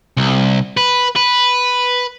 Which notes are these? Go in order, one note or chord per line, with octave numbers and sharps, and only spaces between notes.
C2
B4
B4